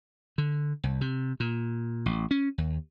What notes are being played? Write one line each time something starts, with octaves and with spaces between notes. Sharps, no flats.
D3
C2
C3
A#2
A1
C#4
D#2